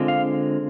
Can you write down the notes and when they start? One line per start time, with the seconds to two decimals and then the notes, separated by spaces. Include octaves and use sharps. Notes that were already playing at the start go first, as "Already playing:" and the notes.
Already playing: D3 G#3 C4 F4
0.08 F5